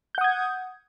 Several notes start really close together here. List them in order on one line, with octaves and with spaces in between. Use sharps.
G6 F#5 D#6 G#6